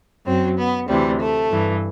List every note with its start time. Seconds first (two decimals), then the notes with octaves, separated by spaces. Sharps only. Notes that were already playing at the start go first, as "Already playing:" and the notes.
0.26 F#2 F#3 C4
0.57 B3
0.88 D2 C3 E3 G3
1.19 A3
1.50 G2 E3